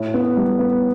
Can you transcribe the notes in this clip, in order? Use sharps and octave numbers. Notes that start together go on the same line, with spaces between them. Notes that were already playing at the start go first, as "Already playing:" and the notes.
Already playing: A2
B3
G3
B3